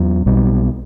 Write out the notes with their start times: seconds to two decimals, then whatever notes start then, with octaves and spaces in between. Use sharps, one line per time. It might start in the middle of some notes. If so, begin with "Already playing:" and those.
Already playing: E2 F#3
0.26 B1 B2 G3